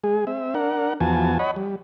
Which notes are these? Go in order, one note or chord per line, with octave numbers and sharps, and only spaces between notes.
G#3 G#4
C4 E5
D4 A#4 F#5
E2 F3 B3 F#4 G#5 A5
C#5 D#5 F#5 B5
G3